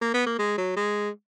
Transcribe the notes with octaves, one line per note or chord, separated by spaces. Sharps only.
A#3
B3
A#3
G#3
F#3
G#3